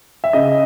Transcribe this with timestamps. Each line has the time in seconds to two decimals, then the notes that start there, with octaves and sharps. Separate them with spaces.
0.24 E5
0.33 C#3 D#5